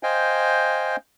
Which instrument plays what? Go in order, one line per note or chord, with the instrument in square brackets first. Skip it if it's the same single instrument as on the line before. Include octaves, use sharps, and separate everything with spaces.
[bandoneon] C5 D#5 F5 G5 G#5